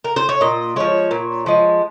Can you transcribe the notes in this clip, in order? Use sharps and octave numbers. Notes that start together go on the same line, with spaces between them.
A#4
C5
C#5
A#2 D#5
F3 G#3 C#5
A#2
F3 G#3